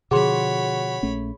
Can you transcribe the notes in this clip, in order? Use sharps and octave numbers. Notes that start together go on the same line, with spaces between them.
B2 D3 F3 F#4 G#4 C#5 B5 C6
A#1 A3 C#4